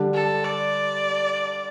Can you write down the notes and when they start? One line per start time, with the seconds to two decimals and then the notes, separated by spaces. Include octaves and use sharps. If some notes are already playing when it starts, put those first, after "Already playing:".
Already playing: D3 G3 D4 G4
0.14 A4
0.44 D5